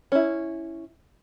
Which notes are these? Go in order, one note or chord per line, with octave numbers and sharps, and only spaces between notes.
C#4 E4